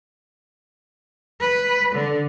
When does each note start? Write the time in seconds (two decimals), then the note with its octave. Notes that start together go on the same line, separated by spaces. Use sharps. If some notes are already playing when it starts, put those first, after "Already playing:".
1.41 B4
1.95 D3